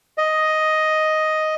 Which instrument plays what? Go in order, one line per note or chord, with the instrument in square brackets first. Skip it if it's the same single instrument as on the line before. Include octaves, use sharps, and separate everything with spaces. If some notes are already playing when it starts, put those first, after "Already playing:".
[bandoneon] D#5